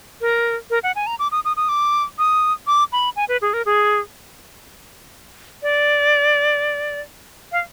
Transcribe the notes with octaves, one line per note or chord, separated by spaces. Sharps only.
A#4
A#4
F#5
G#5
A#5
D6
D#6
D#6
D#6
D6
D#6
D6
B5
G#5
B4
G#4
A#4
G#4
D5
F5